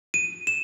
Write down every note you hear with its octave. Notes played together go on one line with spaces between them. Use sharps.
D#7
E7